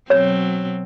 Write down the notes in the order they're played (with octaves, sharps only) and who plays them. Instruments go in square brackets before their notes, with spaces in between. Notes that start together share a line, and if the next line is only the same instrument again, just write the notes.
[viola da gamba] B2 F#3 C4 [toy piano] C#5